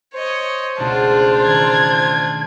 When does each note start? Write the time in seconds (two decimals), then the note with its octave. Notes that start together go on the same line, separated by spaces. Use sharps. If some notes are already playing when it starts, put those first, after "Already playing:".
0.14 C5 C#5 D#5
0.78 C#2 B2 A3 D4 F4
1.46 D#3 G#6